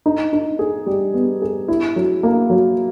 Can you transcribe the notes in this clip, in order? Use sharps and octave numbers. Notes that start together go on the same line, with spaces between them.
D#4
D#4
G#4
G3
B3
G#4
E4
F#3
A#3
F#3